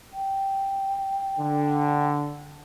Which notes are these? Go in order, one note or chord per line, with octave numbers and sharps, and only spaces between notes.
G5
D3